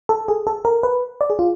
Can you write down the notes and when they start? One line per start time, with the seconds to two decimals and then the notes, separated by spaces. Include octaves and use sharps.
0.09 A4
0.28 G#4
0.47 A4
0.65 A#4
0.83 B4
1.21 D5
1.30 G#4
1.39 F4